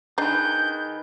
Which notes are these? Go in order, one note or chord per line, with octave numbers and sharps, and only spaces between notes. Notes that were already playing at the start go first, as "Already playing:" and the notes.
D#3 D4 D#4 G#4 B4 G6